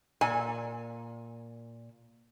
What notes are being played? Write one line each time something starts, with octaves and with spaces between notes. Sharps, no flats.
A#2 G#5